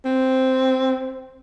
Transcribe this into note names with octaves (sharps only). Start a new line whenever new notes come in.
C4